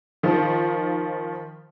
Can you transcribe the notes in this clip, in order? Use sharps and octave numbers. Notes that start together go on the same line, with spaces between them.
D#3 F3